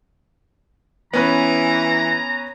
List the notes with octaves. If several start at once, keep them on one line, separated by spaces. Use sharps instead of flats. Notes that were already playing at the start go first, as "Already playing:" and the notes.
E3 B3 C#4 B4 A#5